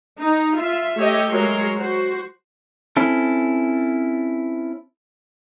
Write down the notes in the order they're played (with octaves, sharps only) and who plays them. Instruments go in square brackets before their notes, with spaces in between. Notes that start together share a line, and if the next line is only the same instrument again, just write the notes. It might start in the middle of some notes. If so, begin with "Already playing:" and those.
[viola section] D#4
F4 E5
A3 G4 C#5 D#5 E5
F#3 G#3 A#4 C#5 C6
F#4 C5
[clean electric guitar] C4 C#4 E4 A4